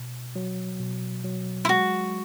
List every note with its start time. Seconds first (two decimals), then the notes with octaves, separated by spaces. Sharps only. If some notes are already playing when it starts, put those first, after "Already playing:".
Already playing: B2
0.36 F#3
0.80 B2
1.24 F#3
1.65 E4
1.69 G#3 F#4